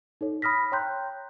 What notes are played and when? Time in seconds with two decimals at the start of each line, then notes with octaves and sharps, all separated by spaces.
0.21 D#4 A4 C#5
0.42 B5 D#6 F6 A#6 B6
0.72 C#5 G5 A#5 C6 F#6 G6